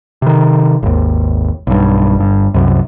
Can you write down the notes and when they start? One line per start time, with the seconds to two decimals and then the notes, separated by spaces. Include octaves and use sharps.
0.22 C3 D#3
0.83 G#1 D#2
1.67 B1 G2
2.16 G1 G2
2.54 C2 F#2